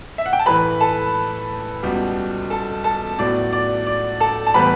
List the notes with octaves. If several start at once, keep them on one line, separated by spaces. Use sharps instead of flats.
E5
F#5
G5
A5
A2 E3 A3 B4 B5
A4 A5
C#2 B2 G3 B3
A4 A5
A4 A5
A2 F#3 B3 D5
D5
D5
A4 A5
A5
A2 E3 G3 B3 B4 B5